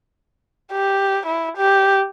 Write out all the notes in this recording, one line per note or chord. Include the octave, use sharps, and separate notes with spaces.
G4
E4
G4